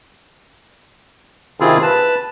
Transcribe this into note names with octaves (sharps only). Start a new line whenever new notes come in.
C3 D#3 C4 E4 F4 G#4
B4 A5